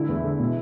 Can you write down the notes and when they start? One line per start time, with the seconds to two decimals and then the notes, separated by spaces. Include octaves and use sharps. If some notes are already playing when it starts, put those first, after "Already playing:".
Already playing: D3 E4
0.09 E2
0.23 D3
0.39 B2